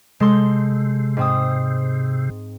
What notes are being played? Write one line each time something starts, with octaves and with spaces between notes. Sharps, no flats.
C3 G#3 A4 C6
G#2 C4 D#6